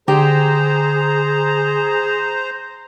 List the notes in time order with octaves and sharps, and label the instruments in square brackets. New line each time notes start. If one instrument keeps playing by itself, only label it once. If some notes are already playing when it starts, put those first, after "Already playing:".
[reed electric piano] D3 [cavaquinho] G4 [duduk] G#4 [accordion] C5 A#5